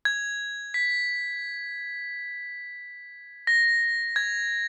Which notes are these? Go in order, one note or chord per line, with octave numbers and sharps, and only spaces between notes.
G#6
B6
A#6
G#6